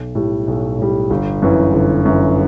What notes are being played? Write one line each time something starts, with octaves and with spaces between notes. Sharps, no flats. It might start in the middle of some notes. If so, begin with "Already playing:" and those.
Already playing: B1
A2 G3
B1
A2 G3
G1
F#2 E3
G1
F#2 E3